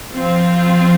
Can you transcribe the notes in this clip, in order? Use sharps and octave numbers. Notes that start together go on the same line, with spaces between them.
F3 C4 F4